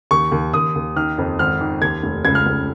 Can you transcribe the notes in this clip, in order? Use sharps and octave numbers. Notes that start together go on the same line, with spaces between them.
D#2 C#6
D#2
D#2 D#6
D#2
D#3 F6
F2
G#1 F6
D#3
D#2 G#6
F1
C#2 G#6
F6
C#2